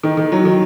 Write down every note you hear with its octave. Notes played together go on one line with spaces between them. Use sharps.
D#3
D#3
F#3
D#3